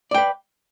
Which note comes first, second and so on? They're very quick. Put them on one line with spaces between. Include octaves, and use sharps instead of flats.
D5 G5 B4